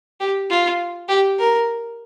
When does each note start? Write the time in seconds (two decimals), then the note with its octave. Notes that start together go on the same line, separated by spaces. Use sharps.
0.20 G4
0.50 F4
1.09 G4
1.39 A#4